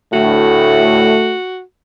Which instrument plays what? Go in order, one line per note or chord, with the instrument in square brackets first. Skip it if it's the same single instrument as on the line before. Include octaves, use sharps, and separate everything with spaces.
[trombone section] D2 A2 [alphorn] A3 [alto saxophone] F#4